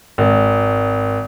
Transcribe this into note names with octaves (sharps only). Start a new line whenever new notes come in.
G#1